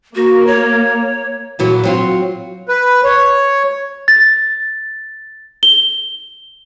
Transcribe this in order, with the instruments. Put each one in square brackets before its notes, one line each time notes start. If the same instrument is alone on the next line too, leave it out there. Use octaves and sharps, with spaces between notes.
[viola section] A#3 [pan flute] F#4
[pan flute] C#5
[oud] A#2 E3 F#3
F#3 C4 F4
[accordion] B4
C#5
[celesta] A6
G7